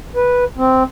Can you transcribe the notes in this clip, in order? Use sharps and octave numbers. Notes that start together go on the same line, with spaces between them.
B4
C4